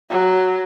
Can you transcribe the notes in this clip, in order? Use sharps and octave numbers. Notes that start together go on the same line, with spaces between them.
F#3